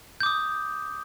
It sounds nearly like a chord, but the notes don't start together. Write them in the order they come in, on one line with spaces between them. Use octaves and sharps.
G6 D6 D#6